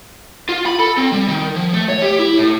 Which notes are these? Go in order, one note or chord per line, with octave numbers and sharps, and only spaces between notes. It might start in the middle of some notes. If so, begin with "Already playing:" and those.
F4
B5
A4
C4
G3
D#3
F3
A3
C#5
G4
E4
A2